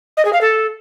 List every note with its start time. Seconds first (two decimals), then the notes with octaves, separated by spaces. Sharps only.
0.17 D#5
0.25 G#4
0.33 F5
0.41 A4